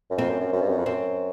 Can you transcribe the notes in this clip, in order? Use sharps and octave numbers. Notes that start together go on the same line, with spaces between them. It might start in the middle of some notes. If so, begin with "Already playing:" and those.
F#2
F2 C4
F#2
F#2
F#2
G2
F#2
F2
F#2 C4